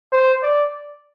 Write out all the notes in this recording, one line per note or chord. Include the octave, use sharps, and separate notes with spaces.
C5
D5